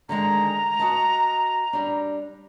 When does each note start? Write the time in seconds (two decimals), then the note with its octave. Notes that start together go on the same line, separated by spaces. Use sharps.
0.09 D3 D#3 G#3 A#5
0.79 F#4 D#5 A5
1.73 G3 D4